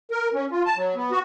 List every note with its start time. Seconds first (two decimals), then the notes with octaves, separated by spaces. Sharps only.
0.11 A#4
0.34 C#4
0.51 F4
0.66 A5
0.77 F#3
0.95 B3
1.11 F#4